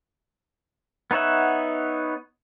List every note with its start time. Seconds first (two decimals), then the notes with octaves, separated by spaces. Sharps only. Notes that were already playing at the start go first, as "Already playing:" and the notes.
1.11 B3 D#4 C#5 E5 F#5